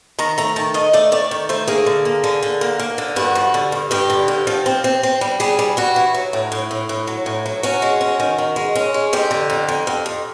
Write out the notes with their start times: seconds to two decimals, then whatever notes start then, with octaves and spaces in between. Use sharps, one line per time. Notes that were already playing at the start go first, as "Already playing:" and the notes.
0.19 D#3 A#5
0.38 A3 A#5
0.56 D#3 A5
0.74 D#3 D#5
0.93 A3 D5
1.12 A3 D5
1.31 D#3
1.49 A3 C5
1.68 A#3 G#4
1.86 D3
2.05 A#3
2.24 D3
2.43 D3
2.61 A#3
2.79 A#3
2.98 D3
3.16 G2 F#4
3.35 F3
3.54 D3
3.72 G2
3.91 G2 G4
4.10 D3
4.28 G2
4.47 F3
4.66 C4
4.84 C4
5.03 C4
5.21 G3
5.40 G3 G#4
5.59 G3
5.77 G3 F#4
5.96 E3
6.14 F#3
6.33 A2
6.52 A2
6.71 A2
6.89 A2
7.07 F#3
7.26 A2
7.46 F#3
7.63 C#4 F#4
7.82 G#3
8.01 C#4
8.20 D#3
8.38 D#3
8.56 G#3
8.75 C#4
8.94 G#3
9.13 F2 G4
9.31 D3
9.50 F2
9.68 F2
9.87 F2
10.06 F2